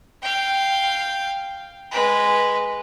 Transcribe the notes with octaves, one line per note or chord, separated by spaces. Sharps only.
F5 G5
G#3 B4